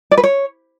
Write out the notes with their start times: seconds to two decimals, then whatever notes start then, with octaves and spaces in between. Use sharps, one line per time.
0.11 D5
0.18 B4
0.24 C#5